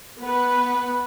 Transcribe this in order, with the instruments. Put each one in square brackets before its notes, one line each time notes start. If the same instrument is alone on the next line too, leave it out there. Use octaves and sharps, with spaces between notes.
[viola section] B3 B4